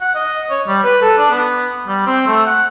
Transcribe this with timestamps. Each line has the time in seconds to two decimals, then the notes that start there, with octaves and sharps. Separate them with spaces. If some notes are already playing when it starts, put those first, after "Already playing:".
0.01 F#5
0.15 D#5
0.50 C#5
0.68 G3
0.84 B4
1.02 A4
1.18 D4
1.31 B3
1.88 G3
2.07 C4
2.27 A3
2.46 F#5